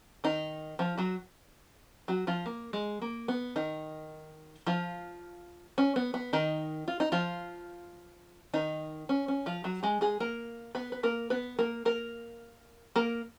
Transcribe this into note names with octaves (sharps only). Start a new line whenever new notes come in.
D#3 D#4
F3 F4
F#3 F#4
F#3 F#4
F3 F4
A#3
G#3
A#3
B3
D#3 D#4
F3 F4
C#4
B3
B3
D#3 D#4
F4
D#4
F3 F4
D#3 D#4
C#4
C#4
F3 F4
F#3 F#4
G#3 G#4
G#3 G#4
A#3 A#4
B3 B4
B4
A#3 A#4
B3 B4
A#3 A#4
A#3 A#4
A#3 A#4